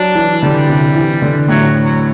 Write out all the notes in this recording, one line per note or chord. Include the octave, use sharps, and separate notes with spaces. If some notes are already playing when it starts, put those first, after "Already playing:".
Already playing: F#3 D4
E3
D3 G3
C3
E3
D3
A2 F#3
F#3